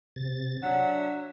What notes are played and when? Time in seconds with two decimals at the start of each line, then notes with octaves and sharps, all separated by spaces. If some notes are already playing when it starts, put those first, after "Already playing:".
0.16 C3 A6
0.63 F#3 D4 E5 F#5